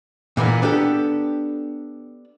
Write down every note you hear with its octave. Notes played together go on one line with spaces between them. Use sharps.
A#2 E3 A#3 B3
B3 D4 G4 A4